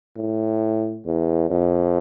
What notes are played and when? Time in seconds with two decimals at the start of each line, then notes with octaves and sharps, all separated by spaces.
0.16 A2
1.05 E2
1.50 F2